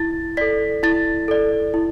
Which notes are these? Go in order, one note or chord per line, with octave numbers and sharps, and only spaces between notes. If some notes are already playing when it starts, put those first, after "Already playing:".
Already playing: E4 A6
A4 D5 B6
E4 A6
A4 D5
E4